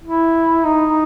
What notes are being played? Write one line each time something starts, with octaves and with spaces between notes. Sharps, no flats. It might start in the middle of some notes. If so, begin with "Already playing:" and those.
E4
D#4